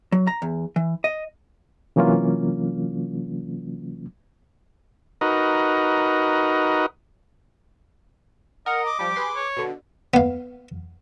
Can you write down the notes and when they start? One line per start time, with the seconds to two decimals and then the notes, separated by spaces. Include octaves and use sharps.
0.12 F#3
0.27 A#5
0.42 E2
0.76 E3
1.04 D#5
1.96 C3 E3 F#3 A#3 C#4 F4
5.21 D#4 F#4 A#4 B4 D#5
8.66 A#4 D#5 F#5
8.86 D6
8.99 F3 G3 G4
9.16 G#4 B4 C6
9.35 C#5
9.57 B2 D3
10.14 B3 F5